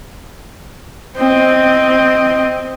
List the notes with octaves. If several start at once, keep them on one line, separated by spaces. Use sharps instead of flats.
C4 D#5